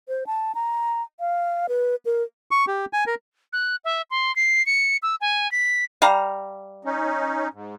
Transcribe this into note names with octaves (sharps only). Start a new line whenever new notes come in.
C5
A5
A#5
F5
B4
A#4
C#6
G4
G#5
A#4
F#6
E5
C6
C7
C#7
E6
G#5
B6
G3 F5 A#5
C#4 D#4
G#2